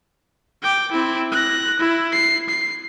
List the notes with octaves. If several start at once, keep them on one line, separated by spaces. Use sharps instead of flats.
G5 D6
C4 E4
F#6 A#6
E4
C7
C7